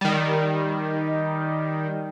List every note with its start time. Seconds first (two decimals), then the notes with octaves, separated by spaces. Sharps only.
0.01 D#3 G3